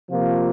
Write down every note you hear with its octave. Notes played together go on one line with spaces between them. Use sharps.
C3 F3 A#3 F4